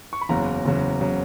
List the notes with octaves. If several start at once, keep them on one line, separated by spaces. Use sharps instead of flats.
C#6
B5
F#1 E2 C#3 F#3 A#5
F#1 E2 C#3 F#3
C#3 F#3